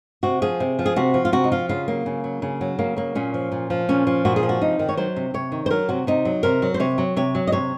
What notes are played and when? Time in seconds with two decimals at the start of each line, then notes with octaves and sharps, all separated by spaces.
0.23 C3 F#4
0.42 F3 G#4
0.60 C3
0.79 F3
0.86 G#4
0.96 C3 F#4
1.14 F3
1.25 F4
1.32 C3 F#4
1.44 D#4
1.52 F3 F4
1.69 C#3 F4
1.88 F#3 A#3
2.06 C#3
2.24 F#3
2.42 C#3
2.61 F#3
2.79 C#3 A#3
2.97 F#3 A#3
3.15 A#2 C#4
3.34 F3
3.52 A#2
3.70 F3
3.88 A#2 C#4
4.07 F3
4.25 A#2 F#4
4.36 G#4
4.43 F3
4.49 F#4
4.61 C3 D#4
4.79 D#3
4.89 C#5
4.97 F#3 C5
5.16 C3
5.34 C3 C#5
5.52 D#3
5.66 C5
5.70 F#3 A#4
5.89 C3 F#4
6.07 C3 D#4
6.25 F#3
6.43 C3 A#4
6.62 F#3
6.74 C5
6.80 C3 C#5
6.98 F#3
7.17 C3 C#5
7.35 F#3
7.47 D#5
7.52 C3 C#5